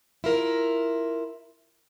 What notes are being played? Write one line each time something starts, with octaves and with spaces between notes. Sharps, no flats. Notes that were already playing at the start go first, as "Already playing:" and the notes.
E4 F4 A#4